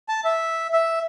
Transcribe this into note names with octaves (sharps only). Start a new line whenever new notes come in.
A5
E5
E5